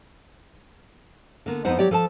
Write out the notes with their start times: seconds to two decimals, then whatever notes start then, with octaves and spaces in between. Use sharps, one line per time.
1.46 D3 A#3 B3
1.65 F2 B3 D#4 C5 F#5
1.78 F#3 G4 C#5 D5 G5
1.91 F3 A4 G#5 A5